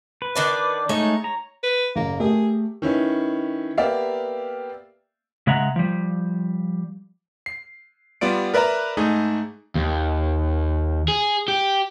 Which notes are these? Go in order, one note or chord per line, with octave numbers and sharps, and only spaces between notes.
B4
D#3 D4 D5
G#3 A3 D#4 C#5
A#5
B4
F#1 A#3
A3 G4 G#4 A#4
D#3 C#4 E4 B4
A#3 B3 G4 D5 E5 F5
C#3 G#3 E5 F#5 A#5
F3 G3
C7
G3 B3 F4 D5 D7
A#4 B4 D5 E5 A#5
G#2 A3 D#4 G#4
D#2
G#4
G4